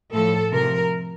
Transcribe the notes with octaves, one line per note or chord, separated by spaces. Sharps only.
A2 F3 A4
C3 F3 A#4